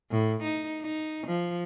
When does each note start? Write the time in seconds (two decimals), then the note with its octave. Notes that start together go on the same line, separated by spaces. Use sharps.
0.12 A2
0.43 D#4
0.82 D#4
1.27 F3